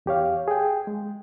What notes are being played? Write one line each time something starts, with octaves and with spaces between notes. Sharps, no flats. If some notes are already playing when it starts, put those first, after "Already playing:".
E2 G4 C#5 F5
G#4 G5
G#3